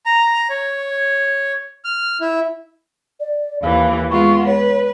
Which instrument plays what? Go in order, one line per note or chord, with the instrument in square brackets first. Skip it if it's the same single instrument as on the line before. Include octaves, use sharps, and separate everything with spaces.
[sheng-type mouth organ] A#5
C#5
F6
E4
[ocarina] D5
[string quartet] D#2 E3 [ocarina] F5
[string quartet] G#3 B3 F4 [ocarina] C#6
[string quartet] B4 [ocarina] C#5